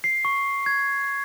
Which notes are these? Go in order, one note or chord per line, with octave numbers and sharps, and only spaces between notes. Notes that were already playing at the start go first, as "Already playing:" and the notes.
C7
C#6
G#6